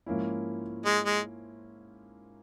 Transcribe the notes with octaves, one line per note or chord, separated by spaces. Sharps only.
G#2 F3 A#3 C#4 E4
G#3
G#3